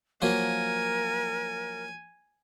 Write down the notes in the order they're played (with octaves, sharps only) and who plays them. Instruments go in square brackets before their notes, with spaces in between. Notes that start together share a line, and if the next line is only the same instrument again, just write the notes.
[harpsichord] F3 F#3 A#3 [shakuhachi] A#4 [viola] G#5